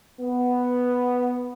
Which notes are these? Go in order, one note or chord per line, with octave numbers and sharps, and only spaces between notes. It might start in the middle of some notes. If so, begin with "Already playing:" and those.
B3